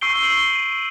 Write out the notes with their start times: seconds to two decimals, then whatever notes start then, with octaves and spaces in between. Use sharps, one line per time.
0.01 C#6 E6 G6 C7 D7 G7
0.23 F#7 G7
0.54 D#7